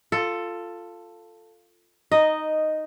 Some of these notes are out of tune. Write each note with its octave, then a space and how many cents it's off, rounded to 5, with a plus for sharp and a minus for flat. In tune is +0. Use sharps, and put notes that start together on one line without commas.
F4 +0 A4 +10
D#4 +0 D#5 -5